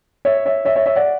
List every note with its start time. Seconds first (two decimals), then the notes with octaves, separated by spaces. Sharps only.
0.25 C#5 E5
0.46 C#5 E5
0.65 C#5 E5
0.76 C#5 E5
0.86 C#5 E5
0.96 D5 F#5